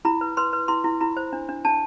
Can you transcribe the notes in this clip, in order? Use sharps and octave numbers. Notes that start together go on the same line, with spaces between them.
E4 B5
B4
B4 C6
B4
E4 C6
E4
E4 B5
C5
D4
D4
D4 A5